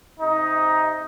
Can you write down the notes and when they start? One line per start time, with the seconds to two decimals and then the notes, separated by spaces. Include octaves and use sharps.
0.19 C3 D#4